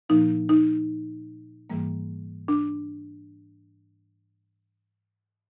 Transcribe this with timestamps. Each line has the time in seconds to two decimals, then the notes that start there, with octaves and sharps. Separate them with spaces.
0.09 A#2 F3 A#3 D#4
0.49 D#4
1.70 G#2 E3 G3 A#3
2.48 D4